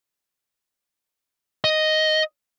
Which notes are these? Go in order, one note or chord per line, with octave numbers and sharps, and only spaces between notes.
D#5